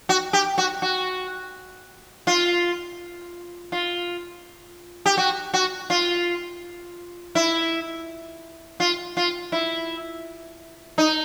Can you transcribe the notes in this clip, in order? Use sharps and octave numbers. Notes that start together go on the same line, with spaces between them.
F#4
G4
F#4
F#4
F4
F4
G4
F#4
F#4
F4
E4
F4
F4
E4
D#4